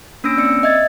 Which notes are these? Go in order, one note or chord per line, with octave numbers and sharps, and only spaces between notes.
A#3 C#4 D4 E6 A#6 D7
C4 D5 E6 C#7
D#5 E5 G#6 A6